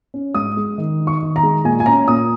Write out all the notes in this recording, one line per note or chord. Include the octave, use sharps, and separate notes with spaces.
C#4
G#2 D#6
G#3
D#3
D#4
C#6
D#3
A#5
G#3
A#2 G#5
G#5
C#4 A#5
A#2 D#6